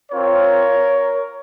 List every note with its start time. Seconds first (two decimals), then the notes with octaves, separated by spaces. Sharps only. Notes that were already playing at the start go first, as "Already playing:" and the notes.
0.12 C4 F4 A#4 C#5